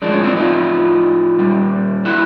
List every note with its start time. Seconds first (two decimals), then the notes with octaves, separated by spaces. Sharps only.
0.02 A2 F3 G#3 D4
0.12 C#4
0.24 C4 D4
0.36 D#4 F4
1.38 A#2 G3
2.05 E4 F#4